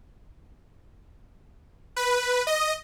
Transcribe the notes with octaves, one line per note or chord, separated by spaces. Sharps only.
B4
D#5